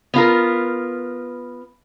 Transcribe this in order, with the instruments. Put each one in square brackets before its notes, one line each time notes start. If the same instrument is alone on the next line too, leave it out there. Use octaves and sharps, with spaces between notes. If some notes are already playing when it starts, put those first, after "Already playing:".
[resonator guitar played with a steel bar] B3 F4 A#4